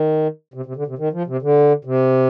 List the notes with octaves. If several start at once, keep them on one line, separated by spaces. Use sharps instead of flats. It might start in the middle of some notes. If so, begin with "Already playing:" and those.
Already playing: D#3
C3
C3
D3
C3
D#3
F3
C3
D3
C3